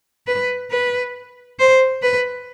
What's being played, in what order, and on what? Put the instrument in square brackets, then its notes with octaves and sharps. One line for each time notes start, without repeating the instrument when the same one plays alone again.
[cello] B4
B4
C5
B4